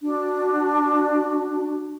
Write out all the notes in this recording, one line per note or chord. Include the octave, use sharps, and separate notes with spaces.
D4 F#4